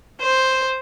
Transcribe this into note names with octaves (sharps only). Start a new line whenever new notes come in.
C5